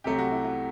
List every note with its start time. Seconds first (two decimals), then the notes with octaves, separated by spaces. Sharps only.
0.04 C2 C3 F#3 A3 G4
0.19 F#4
0.31 E4
0.45 F#4